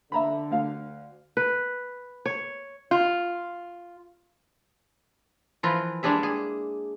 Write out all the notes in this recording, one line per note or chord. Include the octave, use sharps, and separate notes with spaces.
D3 E5 A#5 B5
D2 F5
B4
C#5
F4
E3 F3 E4 F4 A#4 B4
G3 G#3 A#3 D4 G#4 E5
G#4